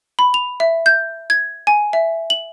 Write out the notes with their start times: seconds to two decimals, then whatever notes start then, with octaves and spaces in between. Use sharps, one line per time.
0.19 B5
0.34 F7
0.60 E5
0.86 G6
1.30 G#6
1.67 G#5
1.93 E5
2.30 F#7